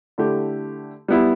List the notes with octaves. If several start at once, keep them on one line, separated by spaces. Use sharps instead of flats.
D3 A3 E4 G4
G3 B3 E4